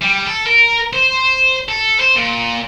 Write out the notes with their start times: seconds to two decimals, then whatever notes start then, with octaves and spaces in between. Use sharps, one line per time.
0.02 G3
0.27 A4
0.46 A#4
0.93 C5
1.69 A4
1.99 C5
2.15 A#2